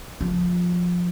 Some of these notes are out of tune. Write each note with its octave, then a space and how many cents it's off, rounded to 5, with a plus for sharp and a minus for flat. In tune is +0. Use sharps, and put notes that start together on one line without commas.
F3 +20